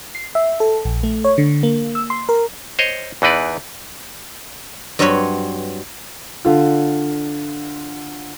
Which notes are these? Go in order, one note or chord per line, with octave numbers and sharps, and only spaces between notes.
C7
E5
A4
A#1
A3
C#5
D3
A#3
E6
C6
A#4
C5 C#5 D#5
E2 E3 D#4 B4 D5
G2 F#3 C4 B4 C#5 B5
D3 F4